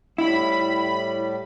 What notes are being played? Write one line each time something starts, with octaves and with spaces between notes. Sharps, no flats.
A2 G3 E4 B5